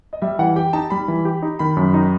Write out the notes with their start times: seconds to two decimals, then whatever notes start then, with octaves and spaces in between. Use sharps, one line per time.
0.13 D#5
0.22 G3 E5
0.39 E3 F#5
0.56 G4 G5
0.73 D#4 A5
0.90 G3 B5
1.08 E3
1.25 G4
1.43 D#4
1.59 D#3 B5
1.77 F#2
1.94 D#4